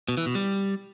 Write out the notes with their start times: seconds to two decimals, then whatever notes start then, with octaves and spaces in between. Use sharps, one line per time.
0.09 B2
0.17 E3
0.26 B2
0.35 G3